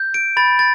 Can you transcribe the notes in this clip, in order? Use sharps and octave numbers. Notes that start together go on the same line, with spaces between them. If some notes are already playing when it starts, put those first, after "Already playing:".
Already playing: G6
D7
B5 A6
A6